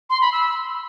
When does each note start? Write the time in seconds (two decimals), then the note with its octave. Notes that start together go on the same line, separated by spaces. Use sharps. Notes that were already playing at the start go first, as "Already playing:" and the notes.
0.10 C6
0.21 B5
0.32 E6